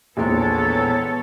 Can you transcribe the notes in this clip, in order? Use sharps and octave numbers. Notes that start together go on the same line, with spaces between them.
A#1 E2 G#3 B3 A4 C#5